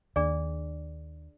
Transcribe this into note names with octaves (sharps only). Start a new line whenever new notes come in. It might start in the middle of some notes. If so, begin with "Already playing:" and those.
D#2 D4 G#4 D5